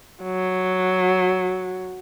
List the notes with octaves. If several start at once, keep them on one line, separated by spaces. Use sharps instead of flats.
F#3